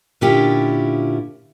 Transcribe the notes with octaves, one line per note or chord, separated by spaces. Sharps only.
A#2 D3 C#4 E4 F4 G4